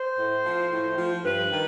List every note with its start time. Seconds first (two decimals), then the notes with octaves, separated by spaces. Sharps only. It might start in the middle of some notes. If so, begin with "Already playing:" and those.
Already playing: C5
0.18 A2
0.45 F3
0.71 A2
0.98 F3
1.24 G2 B4
1.50 D#3 G3